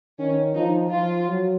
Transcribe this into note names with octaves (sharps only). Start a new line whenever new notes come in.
D#3 C#4
F3 D#4
F3 F4
F#3